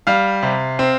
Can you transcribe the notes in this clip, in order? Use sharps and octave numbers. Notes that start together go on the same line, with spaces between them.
G3 F5
C3
C4